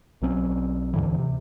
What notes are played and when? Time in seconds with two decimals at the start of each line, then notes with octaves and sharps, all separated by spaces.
0.22 B1 F#3 C4 C#4
0.94 D2 G#2 D3 E3
1.18 C3